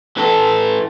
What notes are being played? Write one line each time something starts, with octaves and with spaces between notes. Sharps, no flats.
E3 A4